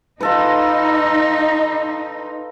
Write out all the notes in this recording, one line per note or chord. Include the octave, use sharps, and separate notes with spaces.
D#4 F4 A4 B4